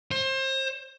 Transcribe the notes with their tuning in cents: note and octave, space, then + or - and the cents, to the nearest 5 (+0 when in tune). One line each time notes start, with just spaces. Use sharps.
C5 +30